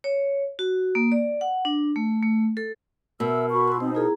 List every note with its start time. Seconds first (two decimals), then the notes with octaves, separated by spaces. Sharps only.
0.04 C#5
0.59 F#4
0.95 A#3
1.12 D5
1.41 F#5
1.65 D4
1.96 A3
2.23 A3
2.57 A4
3.20 B2 A#4 E5 E6
3.51 F#4 B5 C#6
3.68 C6 E6
3.80 C4 D#4 C5
3.95 E4 G#4 A#4 A#5